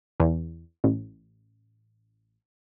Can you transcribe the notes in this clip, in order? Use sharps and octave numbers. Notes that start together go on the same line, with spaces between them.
E2
A1